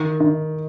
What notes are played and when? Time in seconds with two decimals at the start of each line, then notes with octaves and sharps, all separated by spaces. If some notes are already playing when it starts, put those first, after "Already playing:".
Already playing: D#3
0.20 D#3